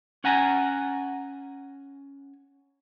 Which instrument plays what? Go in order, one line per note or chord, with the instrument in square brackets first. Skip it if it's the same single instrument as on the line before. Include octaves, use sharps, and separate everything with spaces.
[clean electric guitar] C#4 F#5 G#5 A#5